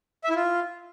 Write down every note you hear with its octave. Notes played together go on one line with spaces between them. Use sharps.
E5
E4
F4